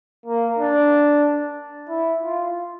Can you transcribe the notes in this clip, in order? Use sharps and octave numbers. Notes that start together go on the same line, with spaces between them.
A#3
D4
E4
F4